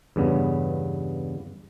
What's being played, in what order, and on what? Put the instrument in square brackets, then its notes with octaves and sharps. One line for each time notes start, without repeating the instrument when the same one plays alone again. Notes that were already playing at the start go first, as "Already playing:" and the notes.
[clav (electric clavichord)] E2 G2 C#3 B3